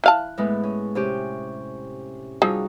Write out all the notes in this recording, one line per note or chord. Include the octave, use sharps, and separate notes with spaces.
E3 F5 A5 F#6
A2 G#3 B3
C#4
C3 C#4 G4
F3 G3 D#4 F#4 G#4